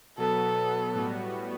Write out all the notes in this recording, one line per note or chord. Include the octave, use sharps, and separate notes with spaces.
B2 F#3 B3 A4
A2 G3 B3 F#4